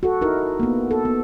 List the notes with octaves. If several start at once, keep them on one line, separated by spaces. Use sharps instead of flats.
F#4 A4
D#4 E4 A#4
A#3 B3
A4
B3